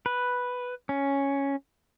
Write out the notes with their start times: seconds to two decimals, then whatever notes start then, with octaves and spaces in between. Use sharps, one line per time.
0.06 B4
0.89 C#4